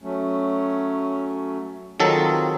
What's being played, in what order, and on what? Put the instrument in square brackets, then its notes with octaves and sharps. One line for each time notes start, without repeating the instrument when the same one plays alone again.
[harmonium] F#3 A3 C#4
[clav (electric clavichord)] D#3 F#3 A4 [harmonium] C4 F4 G#4